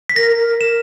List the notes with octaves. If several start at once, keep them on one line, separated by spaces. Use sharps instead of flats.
B6
A#4 A#6
A#4
A#4 E7